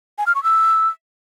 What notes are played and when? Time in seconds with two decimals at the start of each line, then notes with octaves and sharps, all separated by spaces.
0.18 G#5
0.27 F6
0.35 C#6
0.43 E6